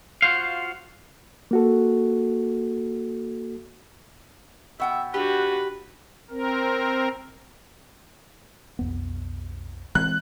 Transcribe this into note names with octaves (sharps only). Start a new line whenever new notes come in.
F4 F#4 C5 F5
A#3 F#4 A4
B2 E5 F#5 G5
D4 F#4 G4 B4
C4 A#4
B1 F2 B3
E3 G#3 C4 F#6